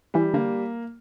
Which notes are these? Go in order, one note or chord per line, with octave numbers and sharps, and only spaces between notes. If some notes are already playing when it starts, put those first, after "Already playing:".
E3 G3
D3 A#3